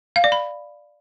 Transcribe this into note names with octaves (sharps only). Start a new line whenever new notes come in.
F5
D5
B5